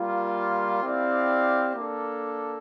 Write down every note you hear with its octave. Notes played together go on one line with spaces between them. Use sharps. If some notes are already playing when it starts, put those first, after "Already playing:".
Already playing: G3 A#3 F4
C4 E4 G4 D5 F5
A#3 D4 A4